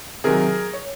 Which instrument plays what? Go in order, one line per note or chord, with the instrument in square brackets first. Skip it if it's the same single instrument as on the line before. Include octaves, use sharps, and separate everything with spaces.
[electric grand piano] C3 D#3 F#3 G#4 A#4
C#5